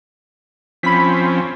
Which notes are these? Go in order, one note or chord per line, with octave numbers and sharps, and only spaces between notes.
F3 C4 C#4 B5 B6